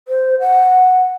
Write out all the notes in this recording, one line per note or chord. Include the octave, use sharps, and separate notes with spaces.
C5
F#5